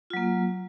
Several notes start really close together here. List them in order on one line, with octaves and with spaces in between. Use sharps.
F4 F#3 A#3